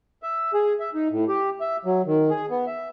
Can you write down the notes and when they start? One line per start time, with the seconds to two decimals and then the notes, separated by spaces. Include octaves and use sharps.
0.23 E5
0.54 G#4
0.80 E5
0.94 D#4
1.11 A2
1.29 G4
1.61 E5
1.85 F#3
2.06 D#3
2.30 G#4
2.50 B3
2.67 E5